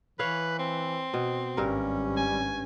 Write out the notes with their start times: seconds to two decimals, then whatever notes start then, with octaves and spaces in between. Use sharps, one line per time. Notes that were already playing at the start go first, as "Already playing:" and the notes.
0.19 E3 B4 C#5 F5
0.59 C4
1.14 B2
1.57 G#1 G2 G3 C#4 A#4
2.17 G#5